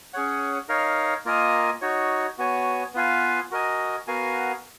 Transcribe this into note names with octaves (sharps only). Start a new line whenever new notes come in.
C#4 G#4 C#5 F#5
D#4 A#4 C#5 F5
A#3 F4 A#4 D#5 G#5
D#4 F#4 C#5
B3 F#4 C#5 G#5
B3 F4 B4 F5 G#5
F#4 A#4 D#5 G#5
B3 F#4 A#4 F5 G#5